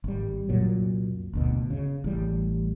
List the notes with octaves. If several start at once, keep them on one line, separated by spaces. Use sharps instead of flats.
G#1 G3
C2 F#2 A#2 F#3
F#1 D2 B2
C#3
A1 G3